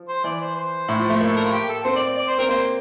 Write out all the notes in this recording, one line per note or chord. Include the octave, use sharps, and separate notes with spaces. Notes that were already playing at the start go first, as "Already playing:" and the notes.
Already playing: F3
C5
E3 D5
C5
C5
A2
F3
A3
A#3
A4
A#4
F4
G4
A4
C4 C5
D5
D5
D5
C5
C4 A#4
A#3 C5